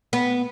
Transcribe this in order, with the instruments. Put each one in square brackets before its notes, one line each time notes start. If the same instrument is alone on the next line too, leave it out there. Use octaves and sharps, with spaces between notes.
[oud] B3